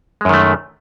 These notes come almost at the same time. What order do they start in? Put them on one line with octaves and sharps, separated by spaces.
G#3 F#2 D#3 A3